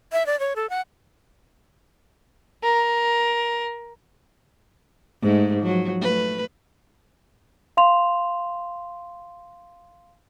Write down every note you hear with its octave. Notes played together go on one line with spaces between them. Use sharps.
E5
D5
C#5
A4
F#5
A#4
G#2 G#3 A3
F3 F#3
A3 B4
F5 C6 F7